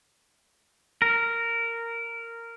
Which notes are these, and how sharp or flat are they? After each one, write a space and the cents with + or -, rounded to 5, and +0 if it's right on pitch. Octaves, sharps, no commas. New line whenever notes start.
A#4 -10